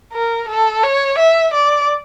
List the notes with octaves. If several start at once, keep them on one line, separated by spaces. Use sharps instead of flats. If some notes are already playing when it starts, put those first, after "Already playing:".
A#4
A4
C#5
E5
D5